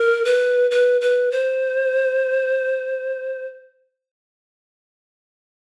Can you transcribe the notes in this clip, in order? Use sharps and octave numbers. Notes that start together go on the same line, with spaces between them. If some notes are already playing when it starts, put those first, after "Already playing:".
Already playing: A#4
B4
B4
B4
C5